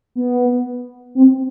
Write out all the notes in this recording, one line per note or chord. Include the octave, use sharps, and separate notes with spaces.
B3
C4